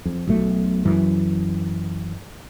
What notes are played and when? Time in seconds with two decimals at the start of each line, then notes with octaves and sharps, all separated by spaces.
0.05 F2
0.27 B1 B2 A3
0.85 F#2 E3